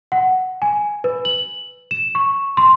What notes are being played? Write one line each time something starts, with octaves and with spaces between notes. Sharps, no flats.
F#5
G#5
B4
F#7
E7
C#6
C6